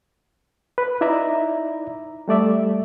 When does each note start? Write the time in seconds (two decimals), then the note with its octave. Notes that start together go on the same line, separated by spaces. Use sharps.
0.78 B4
1.01 D#4 E4 D5 E5 A#5
2.28 G3 A3 D5 E5